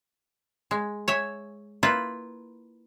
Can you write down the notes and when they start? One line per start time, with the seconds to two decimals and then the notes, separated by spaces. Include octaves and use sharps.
0.71 G#3
1.08 C#5 E5 G#5
1.83 A#3 E4 F4 B4